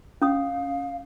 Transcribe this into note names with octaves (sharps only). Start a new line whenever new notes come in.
C#4 F5 D#6